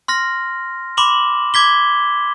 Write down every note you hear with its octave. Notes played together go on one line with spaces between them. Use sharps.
C6 F6 A#6
B5 C6 D6 E7 F#7
D6 G#6 B6 G7